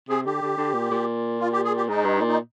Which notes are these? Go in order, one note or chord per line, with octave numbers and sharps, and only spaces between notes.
C3 G#4
D3 G4
D3
D3
A#2
A#2
F4
G4
G#4
G4
G#2 D#4
G2
A#2
D#4